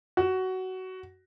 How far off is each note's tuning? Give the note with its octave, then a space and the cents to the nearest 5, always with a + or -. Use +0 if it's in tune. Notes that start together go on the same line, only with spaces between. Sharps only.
F#4 +15